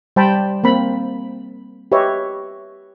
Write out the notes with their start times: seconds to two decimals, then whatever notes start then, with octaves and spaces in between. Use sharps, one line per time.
0.16 G3 C5 G5 A5 B5
0.64 A#3 C4 B5
1.92 G4 B4 C#5 D#5 E5